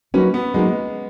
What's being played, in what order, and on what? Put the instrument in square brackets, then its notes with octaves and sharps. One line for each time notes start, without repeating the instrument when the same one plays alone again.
[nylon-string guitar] F#3 A#3 D#4 F#4 B4 [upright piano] C#4
[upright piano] B3
[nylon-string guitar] F#3 A#3 D#4 F#4 B4 [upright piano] G#3